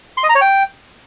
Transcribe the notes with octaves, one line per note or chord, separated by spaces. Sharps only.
C6
D#5
A#5
C#5
G5